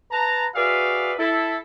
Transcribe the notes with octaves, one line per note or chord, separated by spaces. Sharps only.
B4 A5 A#5
F#4 G#4 B4 D5 E5 F5
E4 A4